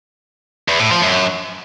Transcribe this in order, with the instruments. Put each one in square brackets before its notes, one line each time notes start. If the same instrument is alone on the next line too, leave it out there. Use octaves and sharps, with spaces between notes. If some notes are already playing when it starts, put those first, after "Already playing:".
[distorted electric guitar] E2
A2
F3
F#2